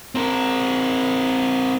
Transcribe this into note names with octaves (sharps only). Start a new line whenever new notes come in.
C4 A#4